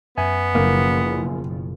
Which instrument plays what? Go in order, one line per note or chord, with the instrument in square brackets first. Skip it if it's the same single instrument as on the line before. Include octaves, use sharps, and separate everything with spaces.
[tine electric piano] F#2 E5 G#5 [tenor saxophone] B3
[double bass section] F#1 B2 F3 [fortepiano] A#3